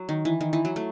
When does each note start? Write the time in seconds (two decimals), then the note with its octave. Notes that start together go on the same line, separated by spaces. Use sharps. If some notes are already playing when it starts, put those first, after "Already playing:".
Already playing: F#3
0.09 D#3
0.25 E3
0.41 D#3
0.53 E3
0.65 F#3
0.76 A3